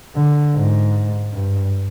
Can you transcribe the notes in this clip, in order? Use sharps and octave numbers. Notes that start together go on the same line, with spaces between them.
D3
G#2
G2